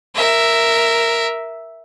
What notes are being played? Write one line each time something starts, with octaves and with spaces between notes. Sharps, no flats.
A#4 E5